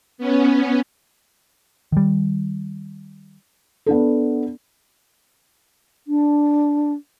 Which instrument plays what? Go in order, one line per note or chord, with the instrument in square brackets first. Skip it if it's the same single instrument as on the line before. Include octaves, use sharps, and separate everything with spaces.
[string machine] B3 C#4
[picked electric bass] D#3 G3
[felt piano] B3 D4 A4
[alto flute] D4